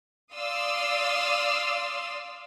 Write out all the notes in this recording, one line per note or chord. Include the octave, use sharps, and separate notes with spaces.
D5 F5 C6 D#6 E6